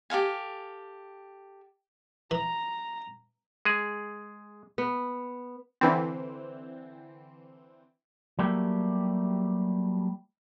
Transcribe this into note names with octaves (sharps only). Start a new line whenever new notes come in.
G4 A4 F5 G#5
E3 A#5
G#3 G#4
B3
D3 E3 C4
F#3 G3 A3 A#3 G4